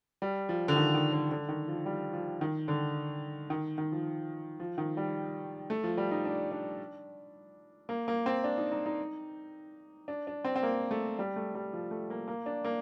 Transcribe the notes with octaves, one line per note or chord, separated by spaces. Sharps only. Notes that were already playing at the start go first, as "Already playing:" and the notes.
G3
F3
D3
D#3
D#3
D3
D3
D#3
F3
G3
F3
D#3
D3
D#3
D#3
F3
F3
D#3
G3
A3
F3
G3
D#4
D4
D4
A#3
A#3
C4
D4
D#4
D#4
D#4
D4
D4
C4
C4
A#3
A3
G3
A3
G3
F3
A3
A#3
A#3
D4
A#3